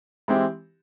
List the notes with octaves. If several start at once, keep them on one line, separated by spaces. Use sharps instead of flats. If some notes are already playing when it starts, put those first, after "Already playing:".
E3 G#3 C4 E4 G4